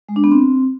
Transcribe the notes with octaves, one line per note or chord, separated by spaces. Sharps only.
G#3
D4
B3
C4